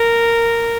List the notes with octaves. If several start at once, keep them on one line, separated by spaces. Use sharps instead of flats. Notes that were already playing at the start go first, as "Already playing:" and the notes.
Already playing: A#4